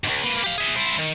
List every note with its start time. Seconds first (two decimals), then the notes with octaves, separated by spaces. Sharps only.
0.04 C#2 G#2
0.24 A#3 B4
0.44 G4 F5
0.58 G#4 E5
0.76 E4 C5
0.99 D#3